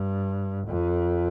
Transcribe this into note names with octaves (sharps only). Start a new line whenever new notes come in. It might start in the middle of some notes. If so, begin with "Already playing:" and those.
Already playing: G2
F2